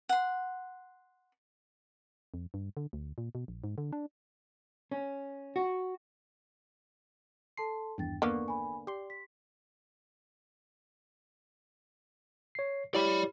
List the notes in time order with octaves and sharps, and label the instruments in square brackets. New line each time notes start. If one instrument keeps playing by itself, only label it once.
[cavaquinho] F#5 C6
[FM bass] F2
G2
D3
D2
A#2
B2
A#1
G#2
D3
D4
[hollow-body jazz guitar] C#4
F#4
[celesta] A4 A5 C6 [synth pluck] C7
[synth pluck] G#1 E2 G2 [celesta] D4 G5 A6
[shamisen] D3 A#3 B3 [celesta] C#6
[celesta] G#5 B5
[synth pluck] G4 C6 [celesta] D5
[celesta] B6
[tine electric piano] C#5 C7
[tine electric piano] E4 G4 C#5 [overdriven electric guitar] D5 B5